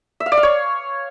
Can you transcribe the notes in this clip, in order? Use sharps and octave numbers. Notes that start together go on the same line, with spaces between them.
E5
F5
D5
F5
C#5